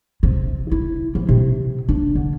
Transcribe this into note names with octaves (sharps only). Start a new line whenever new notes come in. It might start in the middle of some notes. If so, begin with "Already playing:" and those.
C3
E4
E3
C3
D4
D3